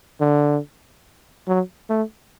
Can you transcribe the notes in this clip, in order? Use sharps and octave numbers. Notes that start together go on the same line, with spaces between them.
D3
F#3
A3